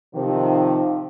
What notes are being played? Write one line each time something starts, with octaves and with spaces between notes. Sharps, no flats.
C3 D#3 F3